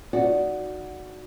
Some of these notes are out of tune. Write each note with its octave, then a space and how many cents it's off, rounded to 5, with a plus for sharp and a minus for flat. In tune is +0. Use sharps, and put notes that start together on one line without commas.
D#4 +0 F#4 +0 D5 -10